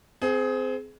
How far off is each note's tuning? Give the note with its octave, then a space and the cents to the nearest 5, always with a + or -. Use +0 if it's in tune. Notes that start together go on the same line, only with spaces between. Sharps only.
C4 -20 G#4 +20